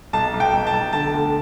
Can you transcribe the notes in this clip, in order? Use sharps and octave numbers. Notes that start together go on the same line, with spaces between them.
B1 A5
B1
G5
B1
A5
B1
D3 A5
D2